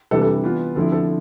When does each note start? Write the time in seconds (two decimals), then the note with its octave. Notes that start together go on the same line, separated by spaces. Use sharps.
0.11 C3 E3 G3 D4 A4
0.22 A4
0.43 E3 B3 F4
0.75 D3 F3 A3 C4 E4 A4
0.92 A4